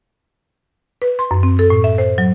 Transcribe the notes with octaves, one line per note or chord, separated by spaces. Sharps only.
B4
C6
F#2
C4
A4
A2
E5
C5
F#3